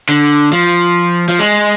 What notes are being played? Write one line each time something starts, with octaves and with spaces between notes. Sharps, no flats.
D3
F3
F3
G#3